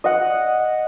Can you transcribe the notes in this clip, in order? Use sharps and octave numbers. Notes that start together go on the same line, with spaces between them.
D#5 F#5